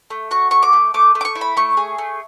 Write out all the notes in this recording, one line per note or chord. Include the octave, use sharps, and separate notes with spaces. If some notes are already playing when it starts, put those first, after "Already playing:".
A3
F#4 C#6
A3 C#6
D6
A3
A3 D6
A3
D6
C#6
E4
B5
A3 C#6
G#4
A3